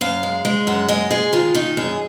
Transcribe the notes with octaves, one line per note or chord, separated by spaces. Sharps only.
F#2 F5
G#3
G#3
F#2 F#5
G#3 D#5
G#3 G#4
D#3 F4
D#3 D#4
F#2 G#4